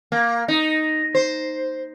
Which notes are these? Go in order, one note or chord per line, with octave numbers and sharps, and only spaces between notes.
A#3
D#4
C5